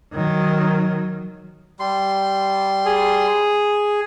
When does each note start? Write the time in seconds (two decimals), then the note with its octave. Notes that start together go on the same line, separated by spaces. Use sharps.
0.13 D#3 F#3
1.80 G3 C6
2.85 G#4